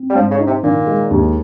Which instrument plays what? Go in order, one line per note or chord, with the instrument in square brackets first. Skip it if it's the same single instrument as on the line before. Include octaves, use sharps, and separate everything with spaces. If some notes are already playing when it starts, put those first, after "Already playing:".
Already playing: [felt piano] C4
[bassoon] G3
[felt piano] G#2 [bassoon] F3
[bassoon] C#3
[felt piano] D#4
[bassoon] C3
[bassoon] A#2 [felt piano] D#3
[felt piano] G#3
D#2